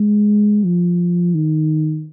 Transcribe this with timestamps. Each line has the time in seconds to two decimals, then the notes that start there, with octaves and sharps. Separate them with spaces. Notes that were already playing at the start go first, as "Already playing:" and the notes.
Already playing: G#3
0.64 F3
1.34 D#3